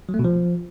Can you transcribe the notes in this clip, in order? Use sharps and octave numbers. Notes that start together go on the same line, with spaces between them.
F#3
A3
B2
F3